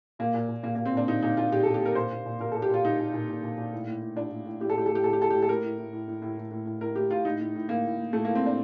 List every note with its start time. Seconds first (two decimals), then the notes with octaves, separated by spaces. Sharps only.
0.19 A#2 A#3
0.34 A#2
0.49 A#2
0.63 A#2 A#3
0.75 A#3
0.78 A#2
0.86 C4
0.94 A#2 D4
1.07 A#2 D#4
1.23 A#2 D#4
1.37 A#2 F4
1.52 A#2 G4
1.63 A4
1.67 A#2
1.74 G4
1.82 A#2 A#4
1.95 A#2 C5
2.11 A#2
2.26 A#2
2.40 A#2 A#4
2.52 A4
2.55 A#2
2.62 G4
2.69 A#2 F4
2.84 A#2 D#4
2.99 A#2
3.13 A#2
3.29 A#2
3.43 A#2
3.58 A#2
3.72 A2
3.87 A2
4.02 A2
4.16 A2 D4
4.31 A2
4.46 A2
4.60 A2 G4
4.70 A4
4.75 A2 G4
4.86 A4
4.90 A2 G4
5.04 A2 A4
5.13 G4
5.20 A2 A4
5.30 A2 G4
5.43 A4
5.49 A2 A#4
5.64 A2
5.78 A2
5.93 A2
6.08 A2
6.22 A2
6.38 A2
6.51 A2
6.66 A2
6.81 A2 A#4
6.96 A2 G4
7.11 A2 F4
7.25 A2 D#4
7.40 A2
7.55 A2
7.69 A2 A#3
7.84 A2
7.98 A2
8.13 A2 A3
8.25 A#3
8.29 A2
8.35 C4
8.43 A2 D4